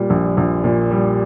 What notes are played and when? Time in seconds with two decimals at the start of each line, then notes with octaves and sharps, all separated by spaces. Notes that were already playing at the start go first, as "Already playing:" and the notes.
Already playing: A#2 G3
0.10 A#1
0.37 A#1
0.64 A#2
0.91 G3